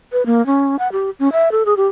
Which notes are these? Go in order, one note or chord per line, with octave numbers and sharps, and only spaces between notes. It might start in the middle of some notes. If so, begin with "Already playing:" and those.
B4
A#3
C#4
F#5
G4
C#4
E5
A4
G#4
G4